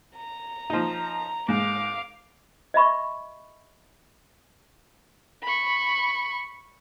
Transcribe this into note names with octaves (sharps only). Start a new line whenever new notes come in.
A#5
F3 D#4
G#2 F5 D6
D#5 E5 B5 C#6
B5 C#6